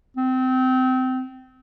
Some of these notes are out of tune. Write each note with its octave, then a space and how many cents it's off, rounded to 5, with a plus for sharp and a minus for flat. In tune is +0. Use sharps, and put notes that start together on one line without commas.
C4 -25